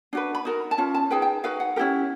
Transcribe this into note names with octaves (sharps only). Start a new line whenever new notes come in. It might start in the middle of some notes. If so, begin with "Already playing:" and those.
D4 F#4 B4
B5
D#4 F#4 A#4
A5
C#4 F4
A5
D#4 G#4 B4 G5
G5
D#4 F#4 B4 F5
F#5
C#4 E4 G4 A#4